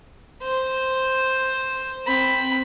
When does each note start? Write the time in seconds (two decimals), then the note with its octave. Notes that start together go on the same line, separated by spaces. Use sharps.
0.42 C5
2.06 C4 B5